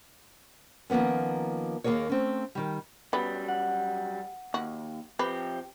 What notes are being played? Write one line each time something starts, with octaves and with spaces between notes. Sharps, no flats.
D#3 F3 A#3 B3 C#4
D#2 A#3 G#4 A#4 C#5
A3 C4 C#4
D#3 G3
F#2 F#3 G3 B3
F#5
D#2 F#4
F3 C4 G4 B4